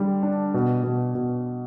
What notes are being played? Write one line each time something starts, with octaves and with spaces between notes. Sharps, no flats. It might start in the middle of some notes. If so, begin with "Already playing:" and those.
Already playing: D3 G3
D4
B2
B2
B2